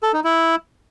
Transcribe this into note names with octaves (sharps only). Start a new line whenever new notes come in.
A4
D#4
E4